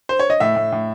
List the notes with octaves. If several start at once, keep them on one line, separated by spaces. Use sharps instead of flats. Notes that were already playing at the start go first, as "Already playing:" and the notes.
C5
C#5
D#5
A2 E5
A2
A2